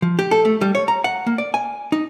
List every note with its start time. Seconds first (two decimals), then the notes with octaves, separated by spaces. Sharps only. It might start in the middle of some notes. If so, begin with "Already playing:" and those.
0.02 F3
0.19 G4
0.31 A4
0.45 A3
0.61 G3
0.75 C#5
0.88 A#5
1.04 F#5
1.26 A#3
1.38 D5
1.54 G#5
1.92 D#4